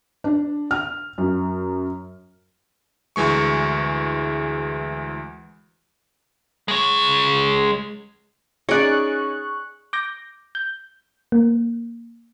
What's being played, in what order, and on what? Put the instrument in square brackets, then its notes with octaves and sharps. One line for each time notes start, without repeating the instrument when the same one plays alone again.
[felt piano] D4
F6
F#2
[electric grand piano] D2 E3 G#3 C#6
[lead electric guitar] G#3 C#5
[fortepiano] C#4 D#4 [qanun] G#4 D5 [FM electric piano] C#6 F#6
[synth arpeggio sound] D6 G6 A#6
G6
A#3